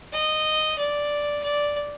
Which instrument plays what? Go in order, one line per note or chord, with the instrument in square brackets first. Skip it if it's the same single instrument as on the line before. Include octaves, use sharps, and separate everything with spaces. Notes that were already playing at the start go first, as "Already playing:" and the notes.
[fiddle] D#5
D5
D5